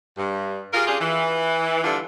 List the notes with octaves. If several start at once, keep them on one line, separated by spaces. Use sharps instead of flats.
G2
F4 G4 G#4 A#4
C#4 D4 F4 G4 G#4
E3
D3 G3 D4 F4 A4